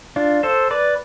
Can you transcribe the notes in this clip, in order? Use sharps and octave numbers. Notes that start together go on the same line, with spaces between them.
D4 F4
A4 C5
B4 D5